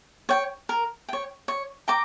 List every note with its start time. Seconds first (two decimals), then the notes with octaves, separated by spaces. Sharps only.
0.29 C#5 G5
0.69 A#4
1.09 C#5 G5
1.48 C#5
1.88 G5 A#5 D6